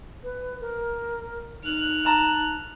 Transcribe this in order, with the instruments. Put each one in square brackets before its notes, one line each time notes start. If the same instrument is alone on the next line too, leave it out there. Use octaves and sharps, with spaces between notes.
[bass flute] B4
A#4
[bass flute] D#4 [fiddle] F6 F#6
[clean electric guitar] A5 A#5